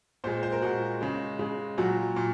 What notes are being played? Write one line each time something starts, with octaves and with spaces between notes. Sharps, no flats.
A#2 G#3 C5
C5
A#4
A#2 G#3 F#4
C#3 G#3
C#3 G#3
A#2 F#3 F#4
A#2